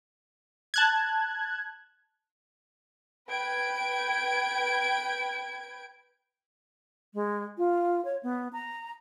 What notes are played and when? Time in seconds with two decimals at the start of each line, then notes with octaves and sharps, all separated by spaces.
0.74 A5 F#6 G#6
3.28 B4 G5 G#6 D7
7.14 G#3
7.58 F4
8.05 C#5
8.23 B3
8.53 A#5